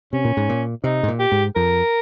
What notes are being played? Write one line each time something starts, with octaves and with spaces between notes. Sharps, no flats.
C3 C#4
A#2
G#2
A#2
C3 D#4
G#2
A#2
G4
G#2
F2 A#4